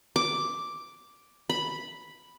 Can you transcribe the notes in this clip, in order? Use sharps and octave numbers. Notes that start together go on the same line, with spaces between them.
D6
B5